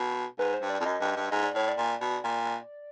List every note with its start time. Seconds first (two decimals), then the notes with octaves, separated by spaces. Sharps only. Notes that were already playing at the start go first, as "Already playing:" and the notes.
Already playing: B2
0.39 G#2 B4
0.54 C5
0.62 G2
0.70 D5
0.80 F2
0.85 F#2 D#5
1.01 G2
1.16 G2
1.31 G#2 D#5
1.44 D5
1.55 A2 C#5
1.68 D5
1.78 A#2
2.01 B2
2.24 A#2